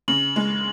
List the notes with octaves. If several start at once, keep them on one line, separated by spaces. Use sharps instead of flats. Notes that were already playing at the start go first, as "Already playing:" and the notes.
C#3 F#7
G#3